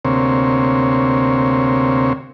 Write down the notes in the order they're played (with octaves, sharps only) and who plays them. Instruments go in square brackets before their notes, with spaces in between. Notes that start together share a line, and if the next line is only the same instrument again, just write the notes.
[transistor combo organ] D2 C3 A#3 C4 C#5